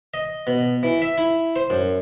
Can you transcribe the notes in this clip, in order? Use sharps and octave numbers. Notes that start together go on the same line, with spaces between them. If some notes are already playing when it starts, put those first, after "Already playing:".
D#5
B2
E3
E5
E4
C5
F#2